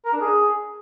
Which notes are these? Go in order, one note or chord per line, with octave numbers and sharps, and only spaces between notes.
A#4
D4
G#4